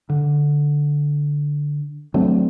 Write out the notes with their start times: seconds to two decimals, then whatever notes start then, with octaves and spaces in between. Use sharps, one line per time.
0.09 D3
2.14 F#3 A3 C4 D4